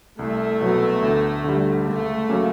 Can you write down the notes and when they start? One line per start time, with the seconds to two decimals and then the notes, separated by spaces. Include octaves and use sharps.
0.19 C2 A3
0.61 B2 F#3 B3
1.02 D2
1.44 D3 G3
1.86 C#2 A3
2.29 C#3 F#3 A#3 C#4